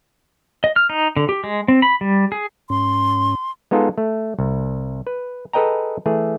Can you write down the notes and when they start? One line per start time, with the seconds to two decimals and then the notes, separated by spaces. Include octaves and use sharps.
0.64 D#5
0.76 F6
0.90 D#4
1.16 D3
1.29 G4
1.44 G#3
1.68 C4
1.82 B5
2.01 G3
2.32 G#4
2.70 G#2 C#4 C6
3.71 G#3 B3 D#4 F4 G#4 A4
3.98 A3
4.39 C2
5.07 B4
5.53 G#4 A4 B4 D#5 G5 A#5
6.06 E3 A3 G#4